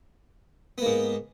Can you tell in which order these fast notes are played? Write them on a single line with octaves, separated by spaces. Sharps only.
B3 A#3 G#2